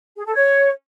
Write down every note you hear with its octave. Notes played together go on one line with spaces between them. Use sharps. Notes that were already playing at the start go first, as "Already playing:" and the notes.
G#4
A4
C#5